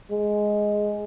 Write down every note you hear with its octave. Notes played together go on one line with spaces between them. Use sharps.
G#3